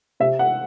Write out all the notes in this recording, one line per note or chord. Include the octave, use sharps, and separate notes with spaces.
C3 E5
F#5